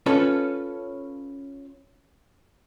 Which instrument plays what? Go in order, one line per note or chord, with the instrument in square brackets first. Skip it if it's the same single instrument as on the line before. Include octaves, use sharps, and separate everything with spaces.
[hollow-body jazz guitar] C#4 F4 A4 B4